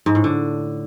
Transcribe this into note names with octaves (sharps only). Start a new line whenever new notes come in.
G#2
A2
D3